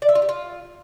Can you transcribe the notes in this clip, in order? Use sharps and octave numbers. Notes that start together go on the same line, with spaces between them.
D5
E5
F4
G4
F4